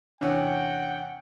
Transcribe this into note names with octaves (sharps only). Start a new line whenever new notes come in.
E2 C3 C#4 D4 F#5 G5